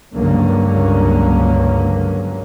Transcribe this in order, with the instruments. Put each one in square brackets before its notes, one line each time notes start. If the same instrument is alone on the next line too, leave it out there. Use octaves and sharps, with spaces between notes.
[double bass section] C#2 G2 D3 F#3 A#3 C#4